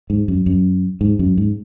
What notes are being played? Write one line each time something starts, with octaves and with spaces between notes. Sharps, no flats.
G#2
F#2
F#2
G#2
F#2
G#2